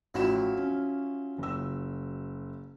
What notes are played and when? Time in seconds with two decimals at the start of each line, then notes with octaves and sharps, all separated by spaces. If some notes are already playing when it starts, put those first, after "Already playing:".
0.14 A1 F3 F#3 E4 E7
0.57 C#4
1.38 F#1 E6